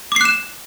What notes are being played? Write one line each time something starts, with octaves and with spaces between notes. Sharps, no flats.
D6 F#6 C7 E7